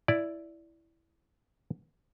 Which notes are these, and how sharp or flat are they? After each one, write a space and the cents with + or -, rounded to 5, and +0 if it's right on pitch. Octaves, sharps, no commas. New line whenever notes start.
E4 +0 D5 -5